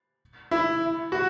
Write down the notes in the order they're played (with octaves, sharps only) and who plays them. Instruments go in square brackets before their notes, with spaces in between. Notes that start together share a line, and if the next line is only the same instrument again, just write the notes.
[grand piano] E4
F#4